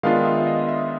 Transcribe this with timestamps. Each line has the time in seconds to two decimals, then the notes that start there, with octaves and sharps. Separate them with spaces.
0.03 D#3 G#3 B3 D4 F4 F5
0.25 E5
0.47 D#5
0.68 E5